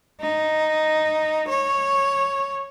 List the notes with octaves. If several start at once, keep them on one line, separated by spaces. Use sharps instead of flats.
D#4
C#5